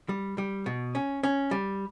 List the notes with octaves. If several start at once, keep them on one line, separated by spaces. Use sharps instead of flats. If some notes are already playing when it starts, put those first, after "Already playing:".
G3
G3
B2
C#4
C#4
G3